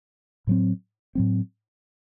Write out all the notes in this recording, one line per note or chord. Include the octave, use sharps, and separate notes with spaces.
A2 F#3 C4
A2 F#3 C4